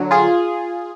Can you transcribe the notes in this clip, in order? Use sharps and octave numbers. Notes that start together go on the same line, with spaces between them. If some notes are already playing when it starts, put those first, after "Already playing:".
Already playing: D3 F#3
F4 G#4